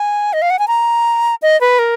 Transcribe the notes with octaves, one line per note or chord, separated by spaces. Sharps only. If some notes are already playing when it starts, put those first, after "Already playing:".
Already playing: G#5
D#5
F5
F#5
G#5
A#5
D#5
B4
A#4